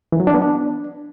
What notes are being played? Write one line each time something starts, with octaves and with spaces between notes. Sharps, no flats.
E3
F#3
D4
B3
D4